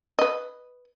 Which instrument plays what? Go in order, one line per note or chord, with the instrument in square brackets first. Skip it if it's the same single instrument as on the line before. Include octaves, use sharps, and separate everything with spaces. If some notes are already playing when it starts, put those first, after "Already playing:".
[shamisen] B4 D#5